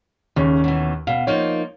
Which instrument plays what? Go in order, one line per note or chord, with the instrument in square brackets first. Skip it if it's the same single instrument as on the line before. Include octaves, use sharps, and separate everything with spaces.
[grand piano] D#2 C#4 [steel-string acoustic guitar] C#3
[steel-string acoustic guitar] B2 E3
[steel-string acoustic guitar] B2 [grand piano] F5
[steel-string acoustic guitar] F3 A#3 D#4 [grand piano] C#5